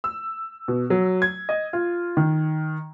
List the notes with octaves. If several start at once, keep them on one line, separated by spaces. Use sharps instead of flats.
E6
B2
F#3
G#6
D#5
F4
D#3